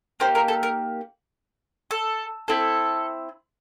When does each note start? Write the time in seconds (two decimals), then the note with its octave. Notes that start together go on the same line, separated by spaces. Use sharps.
0.20 A#3 D#4 G4 C5
0.35 A#4
0.48 A4
0.63 A#4
1.91 A4
2.48 C4 E4 A4